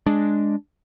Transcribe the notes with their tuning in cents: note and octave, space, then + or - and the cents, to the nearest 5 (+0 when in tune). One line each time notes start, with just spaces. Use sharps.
G#3 +5 D4 +0